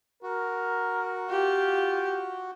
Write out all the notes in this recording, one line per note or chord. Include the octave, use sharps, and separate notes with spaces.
F#4 A#4
F4 G4